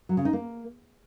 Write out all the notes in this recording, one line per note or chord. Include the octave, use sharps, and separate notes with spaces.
F#3
C#3
D#4
A#3